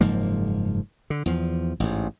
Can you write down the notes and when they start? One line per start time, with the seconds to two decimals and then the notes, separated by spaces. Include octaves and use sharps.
0.01 F#1 G#2 F3 A#3
1.10 D3
1.26 E2 F3
1.80 A1 G#2